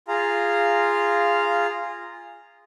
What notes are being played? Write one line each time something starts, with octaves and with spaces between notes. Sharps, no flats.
F4 G#4 F5 A#5